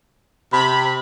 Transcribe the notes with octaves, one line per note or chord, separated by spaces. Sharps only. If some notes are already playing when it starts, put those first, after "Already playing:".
C3 B5